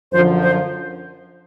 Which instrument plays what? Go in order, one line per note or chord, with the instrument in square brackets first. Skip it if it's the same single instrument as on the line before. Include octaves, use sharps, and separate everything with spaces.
[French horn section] F#2 D3 F3 [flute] C5
[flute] C5